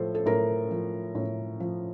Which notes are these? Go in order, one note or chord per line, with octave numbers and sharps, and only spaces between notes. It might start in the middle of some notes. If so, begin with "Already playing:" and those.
Already playing: A2 F3 A4 C5
A4
A2 A#4
F3
A2
F3